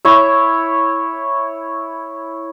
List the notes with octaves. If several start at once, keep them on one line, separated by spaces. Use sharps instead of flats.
E4 C#5 E5